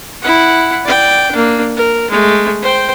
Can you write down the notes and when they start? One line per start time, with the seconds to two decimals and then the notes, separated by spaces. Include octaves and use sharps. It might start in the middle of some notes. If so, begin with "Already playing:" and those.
0.22 E4 F#5
0.85 D5 G5
1.31 A#3 D4
1.77 A#4
2.10 G#3 A3
2.62 C5 G5